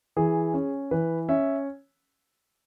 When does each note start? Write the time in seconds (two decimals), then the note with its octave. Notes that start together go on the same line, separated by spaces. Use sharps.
0.16 E3 G#4
0.54 C#4
0.91 E3 B4
1.29 C#4 E5